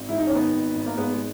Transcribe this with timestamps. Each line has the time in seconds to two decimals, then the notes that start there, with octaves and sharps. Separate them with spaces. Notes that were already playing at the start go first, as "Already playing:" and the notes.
Already playing: G#1
0.09 G#2 E4
0.18 D#4
0.27 C#4
0.31 D#3 B3 D#4
0.53 G#1
0.75 G#1
0.86 A#3
0.97 G#1 G#3 B3
1.14 G#3